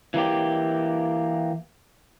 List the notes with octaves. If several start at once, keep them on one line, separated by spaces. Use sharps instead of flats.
E3 A#3 G4